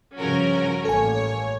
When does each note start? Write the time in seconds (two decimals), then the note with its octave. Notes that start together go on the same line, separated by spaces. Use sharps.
0.17 G2 C#3 F3 C#4 F#4 A#4
0.85 A1 A#3 A4 C#5 G#5